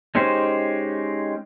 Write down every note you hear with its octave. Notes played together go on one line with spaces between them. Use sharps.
G#3 C#4 D#4 G4 C5